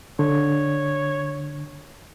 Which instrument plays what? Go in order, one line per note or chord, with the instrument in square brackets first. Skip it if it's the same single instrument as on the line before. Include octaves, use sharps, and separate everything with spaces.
[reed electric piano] D3 [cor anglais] C#5